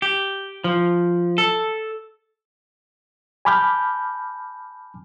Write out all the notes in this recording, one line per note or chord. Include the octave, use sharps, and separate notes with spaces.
G4
F3
A4
G#5 A5 B5 D6 F6 G6